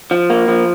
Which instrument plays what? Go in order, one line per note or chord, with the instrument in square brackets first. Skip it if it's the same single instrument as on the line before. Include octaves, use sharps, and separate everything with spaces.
[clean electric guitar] F3
A#3
F3